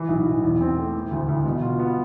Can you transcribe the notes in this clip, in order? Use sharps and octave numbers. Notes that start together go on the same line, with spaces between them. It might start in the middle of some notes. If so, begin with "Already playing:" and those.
Already playing: E3
B1
B1
E2
C4
A3
E3
D2
D2
B2
F4
B3